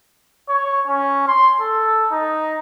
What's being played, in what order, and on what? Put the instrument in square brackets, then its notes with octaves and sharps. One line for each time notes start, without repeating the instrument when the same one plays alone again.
[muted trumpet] C#5
C#4
C6
A4
D#4